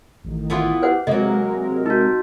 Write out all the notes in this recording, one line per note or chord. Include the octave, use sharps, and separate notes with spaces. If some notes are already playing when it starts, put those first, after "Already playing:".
A1 D#3
E3 B3 F4
G4 B4 C5 F#5
C3 F#3 G#3 A#3 A#4 D#5
D#4 F#4